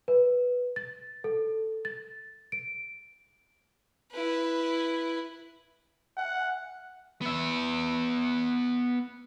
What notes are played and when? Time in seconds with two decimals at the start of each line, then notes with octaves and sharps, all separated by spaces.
0.08 B4
0.76 A6
1.24 A4
1.85 A6
2.52 D7
4.11 E4 B4
6.17 F#5
7.21 B3 E5